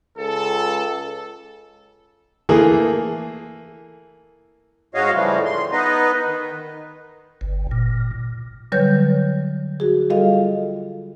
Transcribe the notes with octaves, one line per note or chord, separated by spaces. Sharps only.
C#2 A4
E3 A3 A#3 G#4
G#2 G#3 F#4 C#5 D#5 F5
C#3 E3 F3 G3 A3
C6
B3 D#4 B4 D#5
D#3
G1
A#2
D3 F#3 G3 B4 C#5 G6
F#4 G#4
G3 F4 A4 D#5 F5